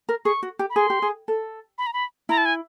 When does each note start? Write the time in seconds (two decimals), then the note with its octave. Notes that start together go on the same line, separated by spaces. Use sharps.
0.09 A#4
0.25 G#4 C#6
0.43 F#4
0.59 G4
0.70 B5
0.76 G#4 C6
0.90 G4
1.02 G#4
1.28 A4
1.78 B5
1.87 A#5
1.93 B5
2.29 E4 A#5
2.37 A5
2.46 G#5